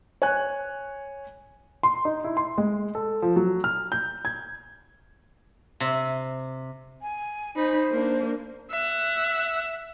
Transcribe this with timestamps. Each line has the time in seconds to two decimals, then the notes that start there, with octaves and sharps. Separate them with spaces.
0.22 C#5 G#5 F#6
1.83 C6
2.05 D#4
2.24 E4
2.37 C6
2.58 G#3
2.95 A4
3.22 F3
3.36 F#3
3.64 F6
3.92 G6
4.25 G#6
5.80 C3
7.02 G#5
7.56 D#4 C5 B5
7.90 A#3 D4
8.71 E5 F#5